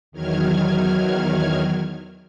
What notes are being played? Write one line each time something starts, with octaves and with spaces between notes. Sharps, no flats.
E2 D#3 F#3 F6 G#6